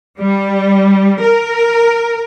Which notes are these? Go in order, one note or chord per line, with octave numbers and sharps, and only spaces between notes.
G3
A#4